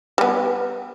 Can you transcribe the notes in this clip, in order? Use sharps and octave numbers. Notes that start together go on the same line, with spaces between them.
G3 B3